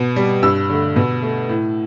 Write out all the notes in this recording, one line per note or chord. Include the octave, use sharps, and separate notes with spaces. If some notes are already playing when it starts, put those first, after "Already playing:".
Already playing: B2
G3
G2 E6
D3 A3
B2
A3
A2